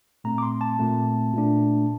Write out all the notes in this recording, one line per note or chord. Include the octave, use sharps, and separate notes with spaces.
A#2 A3 C4 A#5
D6
C6
A5
A#2 A3 C4
A#2 A3 D4